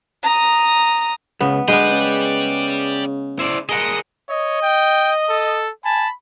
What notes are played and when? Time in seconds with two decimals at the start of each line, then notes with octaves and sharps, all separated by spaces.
0.23 A#5 D#6
1.41 C#2 C#3 B3
1.68 D3 G#3 B3 B4 D5 G5
1.91 C#3
3.39 E4 C5 D5
3.69 G#4 A#4 D#5 F#5
4.29 C#5 D#5
4.62 G5
5.30 A4
5.85 G#5 A5 B5